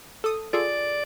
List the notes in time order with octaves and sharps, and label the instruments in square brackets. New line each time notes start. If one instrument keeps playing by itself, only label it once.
[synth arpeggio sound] A4 D#6
[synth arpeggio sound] F4 G#4 A4 [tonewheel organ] D5